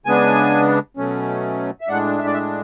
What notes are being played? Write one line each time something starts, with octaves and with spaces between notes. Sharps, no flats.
C#3 G#3 B3 D4 G#5
B2 F#3 A3 C#4
E5
A2 G#3 D4 F#5
E5
D5
E5